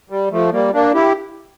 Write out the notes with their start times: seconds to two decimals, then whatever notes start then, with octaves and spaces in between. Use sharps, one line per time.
0.10 G3
0.31 F3 A3
0.52 G3 A#3
0.73 A#3 D4
0.94 E4 G4